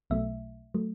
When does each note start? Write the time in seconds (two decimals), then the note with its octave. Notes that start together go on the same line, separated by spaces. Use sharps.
0.10 B1 B2 F#3 A3 E5
0.74 F#3 A3